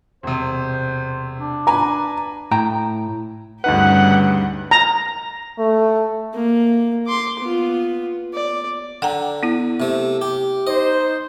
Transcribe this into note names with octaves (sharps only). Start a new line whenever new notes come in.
E1 C3 C5
D4
B4 G#5 A#5
A2 G5 A#5
D2 G2 C#3 D#4 G4 B4 F#5
A#5
A3
A#3
C6 D6
B3 F4
D5
D3 F#5 G5 A#5
B3 E4
C3 A3
G4
D#4 C5 D#5